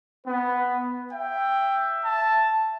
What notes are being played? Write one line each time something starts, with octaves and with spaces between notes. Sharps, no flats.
B3 B4
E5 G5
A5